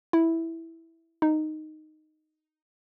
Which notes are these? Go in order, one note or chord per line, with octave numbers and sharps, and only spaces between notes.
E4
D#4